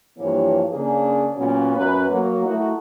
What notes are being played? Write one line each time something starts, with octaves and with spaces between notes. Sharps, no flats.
G2 E3 F3 A#3 C#5
C#3 A#3 D4 G#4
A#2 F#3 B3 C#4
F#2 A#4 B4
F#3 A#3
A3 D#4 E4 F#4